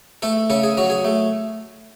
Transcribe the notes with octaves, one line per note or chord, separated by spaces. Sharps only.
A3 A4
C#3 A4
G#4
F#3 F#4
G#4
A3